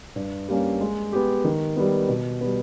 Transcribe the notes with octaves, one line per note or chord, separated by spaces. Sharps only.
G2
G3 A#3 C#4
G#3
B3 G4
D#3
G3 B3
B2
G3 B3